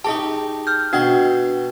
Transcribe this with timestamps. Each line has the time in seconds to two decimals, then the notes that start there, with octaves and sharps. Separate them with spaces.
0.04 D#4 G4 G#4 A5
0.67 F6 G6
0.93 B2 D4 F#5 G5